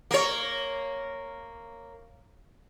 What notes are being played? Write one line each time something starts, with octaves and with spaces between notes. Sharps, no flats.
A#3 C#5